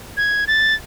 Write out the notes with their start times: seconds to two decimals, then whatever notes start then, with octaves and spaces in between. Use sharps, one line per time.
0.17 G#6
0.47 A6